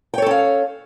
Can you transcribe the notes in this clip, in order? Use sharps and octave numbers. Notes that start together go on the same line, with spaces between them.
C#4 A4 C#5 F5 G5